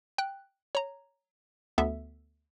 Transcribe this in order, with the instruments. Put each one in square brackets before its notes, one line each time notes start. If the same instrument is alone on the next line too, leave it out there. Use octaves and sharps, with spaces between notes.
[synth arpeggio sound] G5 F#6
C#5 A#5
D2 B3 A4 E5